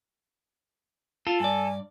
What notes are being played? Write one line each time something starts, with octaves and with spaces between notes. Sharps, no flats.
F4 A4
G2 D5 G#5